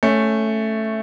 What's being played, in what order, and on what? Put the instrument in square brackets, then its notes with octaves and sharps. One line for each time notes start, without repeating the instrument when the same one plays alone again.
[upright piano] A3 C#4